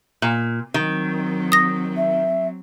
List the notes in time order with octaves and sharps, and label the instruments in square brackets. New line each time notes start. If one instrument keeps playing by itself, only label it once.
[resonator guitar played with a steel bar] A#2
[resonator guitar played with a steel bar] D#3 [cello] F#3 C4
[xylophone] D#6 A#6
[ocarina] E5